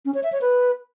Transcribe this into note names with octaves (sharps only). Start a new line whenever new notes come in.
C#4
C#5
E5
C#5
B4